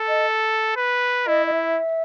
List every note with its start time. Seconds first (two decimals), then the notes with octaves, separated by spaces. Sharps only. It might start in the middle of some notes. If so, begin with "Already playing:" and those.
Already playing: A4
0.09 D#5
0.76 B4
1.27 E4 D#5
1.47 D#5
1.52 E5